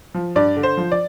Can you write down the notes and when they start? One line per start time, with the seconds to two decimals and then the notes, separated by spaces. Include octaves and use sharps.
0.14 F3
0.36 G2 D5
0.57 D3
0.63 C5
0.77 F3
0.92 D5